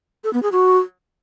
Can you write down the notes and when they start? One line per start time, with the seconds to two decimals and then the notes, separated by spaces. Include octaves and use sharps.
0.24 A4
0.33 B3
0.43 G#4
0.52 F#4